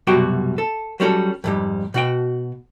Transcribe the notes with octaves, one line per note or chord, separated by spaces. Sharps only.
C2 F#2 B2 G3 F#4 G5
A4
F#3 G3 C#4 A4
F2 G#2 G3
B2 F#4 G5